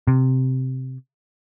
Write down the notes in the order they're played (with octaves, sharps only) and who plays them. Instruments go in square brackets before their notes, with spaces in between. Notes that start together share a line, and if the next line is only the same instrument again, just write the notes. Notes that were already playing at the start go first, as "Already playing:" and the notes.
[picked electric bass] C3